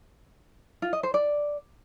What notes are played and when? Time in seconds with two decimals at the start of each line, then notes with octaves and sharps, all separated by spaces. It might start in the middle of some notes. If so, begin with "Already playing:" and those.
0.82 F4
0.93 D#5
1.03 C5
1.14 D5